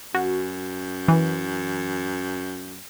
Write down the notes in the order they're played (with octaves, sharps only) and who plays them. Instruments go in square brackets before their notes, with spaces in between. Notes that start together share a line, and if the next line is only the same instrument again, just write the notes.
[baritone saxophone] F#2 [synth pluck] F#4
[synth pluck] E3